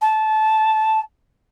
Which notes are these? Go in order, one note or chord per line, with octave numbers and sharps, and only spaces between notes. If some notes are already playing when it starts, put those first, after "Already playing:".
A5